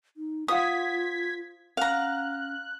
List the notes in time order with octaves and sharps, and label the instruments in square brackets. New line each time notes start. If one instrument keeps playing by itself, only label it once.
[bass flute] D#4
[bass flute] F4 [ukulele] C5 F5 F#5 [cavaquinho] D#6 [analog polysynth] G#6 B6
[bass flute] C#4 [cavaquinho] F5 A#5 [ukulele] F#5 [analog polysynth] F#6